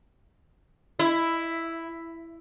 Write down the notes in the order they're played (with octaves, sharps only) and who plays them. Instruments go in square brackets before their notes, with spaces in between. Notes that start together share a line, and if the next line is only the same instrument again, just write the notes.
[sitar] E4